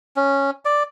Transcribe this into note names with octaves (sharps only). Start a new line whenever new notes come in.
C#4
D5